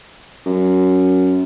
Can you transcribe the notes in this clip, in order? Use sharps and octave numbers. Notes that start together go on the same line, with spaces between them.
F#2